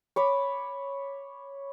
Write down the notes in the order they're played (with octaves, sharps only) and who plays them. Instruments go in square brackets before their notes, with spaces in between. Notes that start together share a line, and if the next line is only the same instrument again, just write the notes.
[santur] C#5 B5 D6